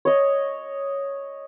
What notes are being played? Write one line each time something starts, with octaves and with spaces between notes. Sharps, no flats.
C#5 D#5